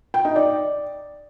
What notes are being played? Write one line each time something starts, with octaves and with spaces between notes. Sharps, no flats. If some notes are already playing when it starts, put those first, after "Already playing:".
G5
D#4
D5